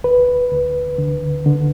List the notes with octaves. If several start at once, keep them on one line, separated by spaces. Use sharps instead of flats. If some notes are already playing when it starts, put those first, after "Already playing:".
D2 B4
D2
D3
D3